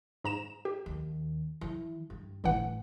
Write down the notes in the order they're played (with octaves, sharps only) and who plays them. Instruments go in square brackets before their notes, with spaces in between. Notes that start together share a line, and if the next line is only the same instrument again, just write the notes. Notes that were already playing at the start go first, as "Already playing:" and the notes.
[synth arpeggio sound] G#2 A#5 E7
G4
[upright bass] D#2
E3
G2
[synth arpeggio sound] G1 E3 F#5 [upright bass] A2